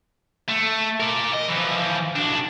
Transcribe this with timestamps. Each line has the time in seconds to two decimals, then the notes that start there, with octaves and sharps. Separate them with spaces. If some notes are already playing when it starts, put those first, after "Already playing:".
0.49 A3
1.00 A#4 D5
1.33 D#5
1.48 E3 F3
2.16 B1 D4